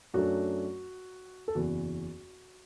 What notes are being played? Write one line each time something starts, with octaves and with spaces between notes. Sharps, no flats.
F#2 F#3 A3 D4 F#4
A4
F#1 E2 E3 F#4